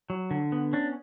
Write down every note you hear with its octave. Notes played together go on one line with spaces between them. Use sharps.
F#3
D3
B3
C#4 D4